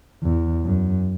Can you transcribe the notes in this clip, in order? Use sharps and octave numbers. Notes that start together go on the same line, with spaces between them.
E2
F#2